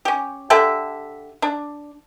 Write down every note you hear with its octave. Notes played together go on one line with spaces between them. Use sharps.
C#4 G4
D3 G4 A4 E5
D4